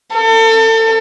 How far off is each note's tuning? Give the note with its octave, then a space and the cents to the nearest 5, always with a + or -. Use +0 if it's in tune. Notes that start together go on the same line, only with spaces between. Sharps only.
A4 +35